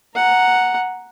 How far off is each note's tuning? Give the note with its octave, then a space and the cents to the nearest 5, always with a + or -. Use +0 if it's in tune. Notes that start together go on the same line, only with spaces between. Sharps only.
F#5 +0 A#5 +0